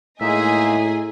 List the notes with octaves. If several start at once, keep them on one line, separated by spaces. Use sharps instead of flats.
A2 G#3 A#3 D#4 G#4 D#5 E5 G#5